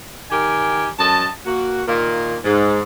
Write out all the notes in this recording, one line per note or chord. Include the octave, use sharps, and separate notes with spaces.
D#3 G4 A#4 G#5
F#2 D#5 A5
A#3 F#4
A#2 D#3 A#3
G#2